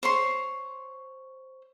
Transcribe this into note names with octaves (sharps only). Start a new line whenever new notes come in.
C5 C#5 C6